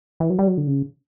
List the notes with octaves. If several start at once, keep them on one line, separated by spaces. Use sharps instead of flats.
E3
F#3
G3
F#3
D3
C#3